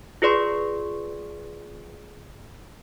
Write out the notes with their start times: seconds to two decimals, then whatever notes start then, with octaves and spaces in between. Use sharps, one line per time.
0.22 F4 G#4 B4 D5 C6 C#6